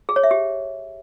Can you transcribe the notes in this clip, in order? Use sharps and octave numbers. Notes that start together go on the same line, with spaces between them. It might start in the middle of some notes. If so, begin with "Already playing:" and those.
G#4
C#5
E5
G4